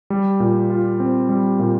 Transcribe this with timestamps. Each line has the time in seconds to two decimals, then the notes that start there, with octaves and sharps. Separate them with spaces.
0.10 G3
0.40 A#2
0.70 F4
1.00 C4
1.29 G3
1.59 A#2